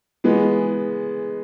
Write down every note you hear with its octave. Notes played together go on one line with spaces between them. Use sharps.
E3 G#3 B3